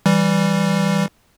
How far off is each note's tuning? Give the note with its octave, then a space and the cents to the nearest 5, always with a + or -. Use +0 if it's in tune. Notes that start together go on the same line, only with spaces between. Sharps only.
E3 +0 G3 +0